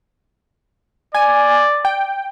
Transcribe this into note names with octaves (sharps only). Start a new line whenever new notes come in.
D5 G#5
G5